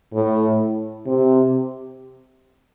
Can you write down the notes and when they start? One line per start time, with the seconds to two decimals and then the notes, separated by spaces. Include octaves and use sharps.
0.13 A2
1.07 C3